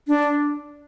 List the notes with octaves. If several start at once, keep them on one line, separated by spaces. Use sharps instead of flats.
D4